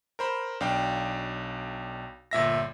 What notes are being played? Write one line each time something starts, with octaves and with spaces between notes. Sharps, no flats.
A#4 C5 B5
B1 D4 F5 G5
G1 A#2 E5 A#6